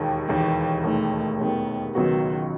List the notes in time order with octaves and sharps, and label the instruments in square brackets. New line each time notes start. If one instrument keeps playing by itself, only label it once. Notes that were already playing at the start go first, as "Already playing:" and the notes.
Already playing: [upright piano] E1 D#2 D#3
[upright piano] E1 D#2 D#3 [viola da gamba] E3
[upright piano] E1 D#2 D#3 [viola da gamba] A3
[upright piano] E1 D#2 D#3 [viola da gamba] B3
[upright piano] C#2 B2 F#3 B3 F#4 [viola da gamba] D#3